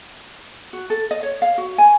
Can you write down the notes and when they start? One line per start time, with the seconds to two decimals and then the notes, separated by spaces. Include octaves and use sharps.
0.73 F#4
0.90 A4
1.11 D#5
1.23 C#5
1.42 F5
1.58 F#4
1.78 G#5